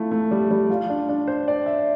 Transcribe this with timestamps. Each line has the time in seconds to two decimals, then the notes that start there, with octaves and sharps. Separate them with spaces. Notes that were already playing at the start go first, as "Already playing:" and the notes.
Already playing: A3 E4 F4
0.12 A3
0.31 G3
0.51 G3
0.70 F4
0.90 D4
1.09 D4
1.28 C5
1.48 D5
1.66 E5